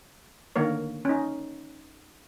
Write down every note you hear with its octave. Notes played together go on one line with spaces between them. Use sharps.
D3 D#3 A#3 A#4 C#5
C#4 D#4